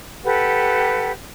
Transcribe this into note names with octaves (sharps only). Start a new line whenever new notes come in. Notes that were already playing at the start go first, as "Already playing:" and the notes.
G4 A4 B4 F#5